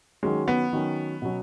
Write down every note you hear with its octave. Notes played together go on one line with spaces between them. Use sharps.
D#3 F#3 G#3 C#4
B3
D#3 F#3 C#4
B2 F#3 C#4